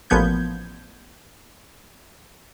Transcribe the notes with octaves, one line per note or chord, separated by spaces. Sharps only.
A1 A#2 F3 B3 G6 G#6